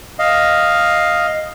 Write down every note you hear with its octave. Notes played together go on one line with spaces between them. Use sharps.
D#5 F5